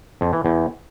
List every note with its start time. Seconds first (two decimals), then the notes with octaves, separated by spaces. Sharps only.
0.21 F2
0.33 E3
0.45 E2